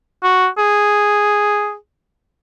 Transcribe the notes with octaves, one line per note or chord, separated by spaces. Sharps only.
F#4
G#4